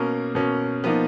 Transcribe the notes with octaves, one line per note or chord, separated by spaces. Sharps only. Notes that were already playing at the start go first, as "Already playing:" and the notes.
Already playing: B2 A#3 C#4 A#4
B2 A#3 C#4
F3 A#3 B3 D#4 B4